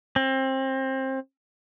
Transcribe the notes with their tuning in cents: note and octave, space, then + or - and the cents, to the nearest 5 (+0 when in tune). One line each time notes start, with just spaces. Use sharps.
C4 +25